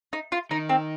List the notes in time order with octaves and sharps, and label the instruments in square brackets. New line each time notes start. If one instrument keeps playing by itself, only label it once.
[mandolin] D#4
F4
[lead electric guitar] D#3 [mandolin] D#4
[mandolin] C4